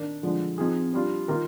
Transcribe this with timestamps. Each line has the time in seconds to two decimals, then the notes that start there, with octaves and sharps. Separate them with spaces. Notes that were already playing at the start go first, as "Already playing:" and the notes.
Already playing: D#3 A#3 D4
0.23 D3 F3 G#3 D4
0.58 F3 C4 D#4 G#4
0.93 G3 D4 F4
1.28 D#3 A#3 F4 A#4